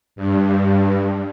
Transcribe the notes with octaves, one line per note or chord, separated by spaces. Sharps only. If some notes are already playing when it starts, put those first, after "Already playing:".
G2